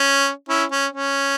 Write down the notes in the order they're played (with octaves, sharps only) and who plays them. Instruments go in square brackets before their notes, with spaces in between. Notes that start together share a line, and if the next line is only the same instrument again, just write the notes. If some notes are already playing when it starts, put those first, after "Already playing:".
Already playing: [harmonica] C#4
C#4 E4
C#4
C#4